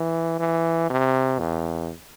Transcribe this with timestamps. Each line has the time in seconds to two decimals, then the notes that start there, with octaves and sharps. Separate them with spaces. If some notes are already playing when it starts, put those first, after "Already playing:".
Already playing: E3
0.40 E3
0.90 C3
1.39 E2